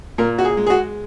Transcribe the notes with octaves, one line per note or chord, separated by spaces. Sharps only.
A#2 A#4
F#4
G#4
G#3
G#4
F#4